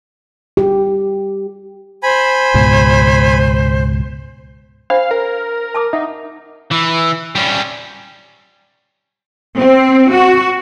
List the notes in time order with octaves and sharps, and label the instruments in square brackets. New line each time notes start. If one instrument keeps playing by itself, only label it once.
[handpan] G4
[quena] C5 [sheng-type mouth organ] G#5 B5
[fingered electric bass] C#2 G#2 B2
[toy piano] D4 C5 B5 [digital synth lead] F5
[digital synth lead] A#4
[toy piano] A5 D6 D#6
[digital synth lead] D#4 [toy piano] E5 F#5
[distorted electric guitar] E3
G3 C#4
[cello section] C4
F#4